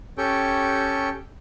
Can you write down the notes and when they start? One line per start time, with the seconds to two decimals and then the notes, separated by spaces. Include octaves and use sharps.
0.18 C#4 G4 A4 G5 C#6